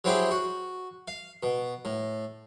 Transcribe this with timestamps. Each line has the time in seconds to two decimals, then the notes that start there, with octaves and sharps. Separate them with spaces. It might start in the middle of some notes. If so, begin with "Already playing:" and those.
0.04 F#3 C4 E4 G4 G#4
0.31 F#4
1.08 F5
1.43 B2
1.85 A2